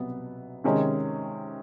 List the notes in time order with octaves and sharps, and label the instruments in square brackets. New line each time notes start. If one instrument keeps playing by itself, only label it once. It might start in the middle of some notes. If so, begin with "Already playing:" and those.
Already playing: [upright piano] C2 B2 F#3 B3
C3 D#3 G#3 C#4